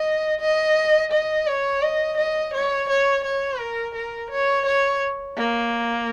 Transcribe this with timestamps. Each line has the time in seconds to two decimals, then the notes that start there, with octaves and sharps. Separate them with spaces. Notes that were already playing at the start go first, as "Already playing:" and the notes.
Already playing: D#5
0.41 D#5
1.12 D#5
1.47 C#5
1.82 D#5
2.18 D#5
2.54 C#5
2.89 C#5
3.24 C#5
3.59 A#4
3.95 A#4
4.31 C#5
4.66 C#5
5.37 A#3